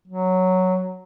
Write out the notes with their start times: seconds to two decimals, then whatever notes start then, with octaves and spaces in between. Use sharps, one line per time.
0.07 F#3